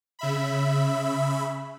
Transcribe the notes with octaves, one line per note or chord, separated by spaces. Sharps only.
C#3 E5 B5